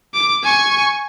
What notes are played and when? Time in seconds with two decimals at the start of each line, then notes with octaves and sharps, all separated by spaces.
0.14 D6
0.43 G#5 C#6